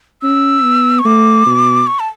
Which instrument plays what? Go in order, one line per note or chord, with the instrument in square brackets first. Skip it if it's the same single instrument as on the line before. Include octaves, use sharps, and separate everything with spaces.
[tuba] C#4 [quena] E6
[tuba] B3
[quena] C#6
[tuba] A3 [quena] D6
[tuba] B2
[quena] C#6
A5